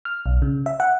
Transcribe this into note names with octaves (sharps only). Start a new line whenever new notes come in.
F6
B1
C#3
E5
F#5